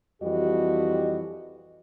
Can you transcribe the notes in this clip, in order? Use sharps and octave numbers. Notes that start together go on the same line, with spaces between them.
F2 E3 G3 F#4 G4 D#5